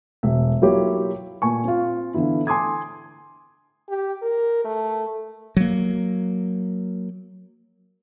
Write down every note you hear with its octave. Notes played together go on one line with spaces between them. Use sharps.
E1 E5
F#3 A#3 E4 F4 G4 C#5
A#2 G#5 C#6
C4 F4
D3 E3 B3 E4
G#5 C6 D6 D#6 G#6
G4
A#4
A3
F#3 A#3